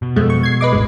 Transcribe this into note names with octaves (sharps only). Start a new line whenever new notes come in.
B2
F2 G#3 A3
C#6
G#6 C7
B4 D#5 D6
G#1 D#2 A2 G#3